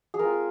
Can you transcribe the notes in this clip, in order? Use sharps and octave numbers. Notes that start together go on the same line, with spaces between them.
G#4
G#3 C4 F4 A#4